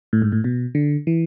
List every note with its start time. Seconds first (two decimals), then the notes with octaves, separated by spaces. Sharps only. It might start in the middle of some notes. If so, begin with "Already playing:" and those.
0.13 A2
0.22 G#2
0.32 A2
0.44 B2
0.75 D3
1.07 E3